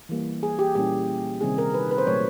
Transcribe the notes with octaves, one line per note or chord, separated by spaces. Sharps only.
E3 G3 A#3
G#4
G4
A#2 G3 A#3 C#4 E4 G4
C3 D#3 G3 C4 D#4 G#4
A#4
B4
B4
C5
A#2 F#3 A3 C#5